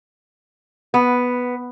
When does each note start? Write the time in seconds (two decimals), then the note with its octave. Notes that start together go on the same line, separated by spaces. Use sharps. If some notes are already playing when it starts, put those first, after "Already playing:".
0.94 B3